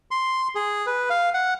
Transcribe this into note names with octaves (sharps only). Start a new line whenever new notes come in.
C6
G#4
B4
F5
F#5